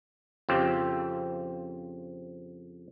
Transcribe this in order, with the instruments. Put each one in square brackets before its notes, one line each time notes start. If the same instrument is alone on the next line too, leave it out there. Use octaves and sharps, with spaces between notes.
[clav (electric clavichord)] F2 C#3 C4 F4 G4